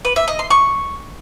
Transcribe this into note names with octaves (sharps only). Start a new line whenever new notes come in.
B4
E5
D#5
C6
C#6